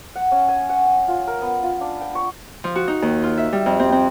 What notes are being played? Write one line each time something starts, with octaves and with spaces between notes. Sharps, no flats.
F#5
C#4
G#5
F#5
G5
F4
A#4
B3
F4
D4
G5
C#6
F3
F#4
D#4
D#2
F4
E5
G3
F2
C4
C4